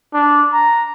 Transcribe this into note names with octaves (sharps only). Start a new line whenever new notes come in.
D4
A#5